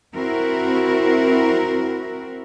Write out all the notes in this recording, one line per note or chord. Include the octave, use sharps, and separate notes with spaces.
C4 E4 F#4 A#4